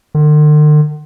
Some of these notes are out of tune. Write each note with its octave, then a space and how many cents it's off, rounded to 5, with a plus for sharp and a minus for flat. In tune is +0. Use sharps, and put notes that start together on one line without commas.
D3 +45